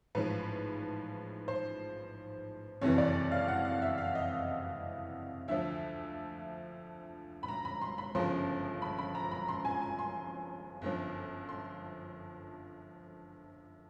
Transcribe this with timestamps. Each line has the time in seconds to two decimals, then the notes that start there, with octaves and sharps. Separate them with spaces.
0.15 A1 G#2 F3 B4
1.48 C5
2.82 F#1 F2 C3 E3 C#5
2.98 D5
3.32 F5
3.48 F#5
3.65 F5
3.82 E5
3.98 F5
4.15 D#5
5.48 D2 D3 F3 E5
7.43 B5
7.48 A#5
7.65 B5
7.82 C6
7.98 B5
8.15 G1 F#2 C#3 F3 C6
8.82 B5
8.98 B5
9.15 A#5
9.31 B5
9.49 C6
9.65 G#5
9.82 G#5
9.99 C6
10.82 G1 F#2 D3 F3
11.49 C6